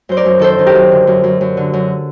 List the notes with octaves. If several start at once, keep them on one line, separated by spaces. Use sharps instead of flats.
F#2 C5
A#4 D5
F#2
D#3 A4 C5
D#3
G4 A#4
F#2
D3
F#2
F#2
F#2
D3
F#2